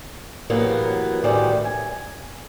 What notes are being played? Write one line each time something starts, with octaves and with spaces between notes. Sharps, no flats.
A2 C3 E3 F#3 A#3 B3
D2 A2 D#3 E3 G3 D5
G#5